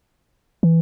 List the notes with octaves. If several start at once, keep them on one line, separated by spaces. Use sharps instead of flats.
E3